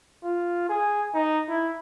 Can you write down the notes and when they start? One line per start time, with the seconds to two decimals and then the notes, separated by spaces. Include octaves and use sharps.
0.23 F4
0.69 G#4
1.14 D#4
1.49 E4